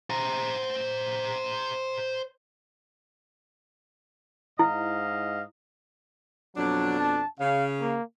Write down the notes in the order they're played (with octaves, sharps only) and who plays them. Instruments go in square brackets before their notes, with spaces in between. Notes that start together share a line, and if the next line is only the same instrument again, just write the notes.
[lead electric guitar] C5 A#5
[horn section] G#2 D#5 F5 [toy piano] E4
[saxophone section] F2 B2 D4 [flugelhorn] F#3
[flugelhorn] A5
[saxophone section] C#3 [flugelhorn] F5
[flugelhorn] A#3